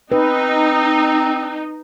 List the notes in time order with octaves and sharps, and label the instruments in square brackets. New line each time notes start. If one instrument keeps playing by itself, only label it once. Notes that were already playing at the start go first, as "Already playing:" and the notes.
[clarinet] C4 [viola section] D#4 [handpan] B4